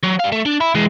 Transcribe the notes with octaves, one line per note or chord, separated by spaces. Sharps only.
F#3
G3 F5
A3
D4
E4
E3 G#3